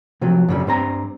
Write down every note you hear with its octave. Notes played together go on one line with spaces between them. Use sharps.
C3 F3 F#3
F#2 C#3 G3
G2 C4 A#5